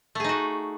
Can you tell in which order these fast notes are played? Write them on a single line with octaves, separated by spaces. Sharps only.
A3 G#4 D#4 F#4